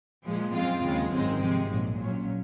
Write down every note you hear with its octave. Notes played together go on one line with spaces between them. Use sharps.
A#2 F3 G#3
F#2 F3 G#3 C4 F4
D#2 C#3 G#3
G#1 F#2 D#3 G#3 C4
C3 F3 G#3
A#1 G#2 F#3
A#1 A#2 F#3 C#4